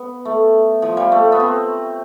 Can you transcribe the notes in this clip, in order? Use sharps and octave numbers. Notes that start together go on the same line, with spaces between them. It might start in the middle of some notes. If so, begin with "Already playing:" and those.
Already playing: B3
A3
F3
G3
A3
B3
C4